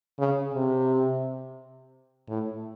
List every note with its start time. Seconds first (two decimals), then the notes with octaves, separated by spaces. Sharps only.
0.19 C#3
0.54 C3
2.28 A2